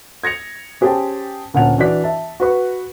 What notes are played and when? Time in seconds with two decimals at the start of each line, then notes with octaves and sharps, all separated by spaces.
0.24 G#6 A#6 C#7 F7
0.81 C#4 G4 G#4 C5 G5 A5
1.54 D2 A#2 C#4 F#5 A5 F7
1.78 E3 D4 F#4 D5 B6
2.04 E5 A5
2.40 F#4 B4 C#6